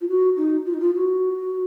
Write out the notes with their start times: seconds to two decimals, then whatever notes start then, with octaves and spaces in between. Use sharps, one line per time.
0.01 F4
0.09 F#4
0.37 D#4
0.66 F4
0.73 D#4
0.80 F4
0.95 F#4